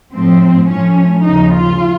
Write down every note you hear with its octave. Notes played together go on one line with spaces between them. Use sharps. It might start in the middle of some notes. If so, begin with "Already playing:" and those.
A2 F3 C4
A2 F3 C#4
D#2 C#3 F3 D#4
F4